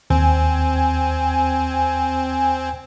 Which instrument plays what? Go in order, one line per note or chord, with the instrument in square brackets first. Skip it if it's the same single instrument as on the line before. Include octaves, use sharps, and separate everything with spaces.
[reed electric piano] D#2 [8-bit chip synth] C4 [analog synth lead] G#5